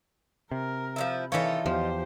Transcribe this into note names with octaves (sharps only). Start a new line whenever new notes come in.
C3 A#4
F3 F#3 E4
E3 D#4 F4 A4 C#5
E2 F3 G4 C5